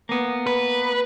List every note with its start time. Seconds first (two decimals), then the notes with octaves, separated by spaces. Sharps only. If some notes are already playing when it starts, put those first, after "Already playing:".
0.09 A#3 B3
0.47 B4